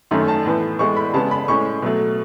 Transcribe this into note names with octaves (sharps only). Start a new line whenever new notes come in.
F#2 D#3 A3 C#4
A5
A2 E3 B3
A2 E3 G#3 B3 C#6
B5
C#3 G#3 B3 A5
B5
A2 G#3 C#4 C#6
B2 F#3 A3